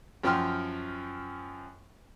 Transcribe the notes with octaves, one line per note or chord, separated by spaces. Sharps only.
F#2 F3 G5 C6 F6